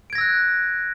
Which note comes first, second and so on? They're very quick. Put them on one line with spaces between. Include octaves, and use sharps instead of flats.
D7 G#6 A#6 E6 F#6